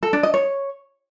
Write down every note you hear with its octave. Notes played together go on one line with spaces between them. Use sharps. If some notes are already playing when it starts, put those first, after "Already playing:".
A4
D4
D#5
C#5